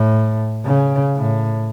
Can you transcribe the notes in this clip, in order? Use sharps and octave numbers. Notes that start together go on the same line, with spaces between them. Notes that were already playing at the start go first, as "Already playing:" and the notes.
Already playing: A2
C#3
A2